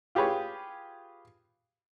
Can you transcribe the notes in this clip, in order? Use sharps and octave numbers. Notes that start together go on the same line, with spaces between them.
F4 G4 G#4 B4 C#5